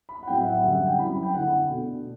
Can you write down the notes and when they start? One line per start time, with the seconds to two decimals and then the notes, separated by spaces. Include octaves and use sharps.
0.09 B5
0.23 F#5
0.27 A2 F#3 C4 E4 G5
0.41 E5
0.44 F#5
0.62 F#2 D3 G3 E5
0.75 F#5
0.87 G5
0.98 F#2 F#3 C4 E4 B5
1.10 B5
1.23 G5
1.34 D3 A3 E4 F#5
1.69 B2 A3 D4